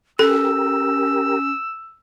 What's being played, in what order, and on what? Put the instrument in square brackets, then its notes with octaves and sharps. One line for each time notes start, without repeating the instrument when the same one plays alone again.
[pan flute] C#4 [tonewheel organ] G4 A#4 [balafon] A4 [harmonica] E6